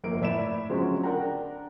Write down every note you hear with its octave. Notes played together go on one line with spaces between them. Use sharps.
G1 F2 A#3 E5 D7
A2 D5 E5 B5 D7 E7
D3 F3 F#3 G#3 C4 C#4
D4 A#4 F#5 G5 A#5